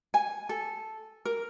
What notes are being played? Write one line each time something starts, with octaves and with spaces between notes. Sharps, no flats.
G#5
A4
A#4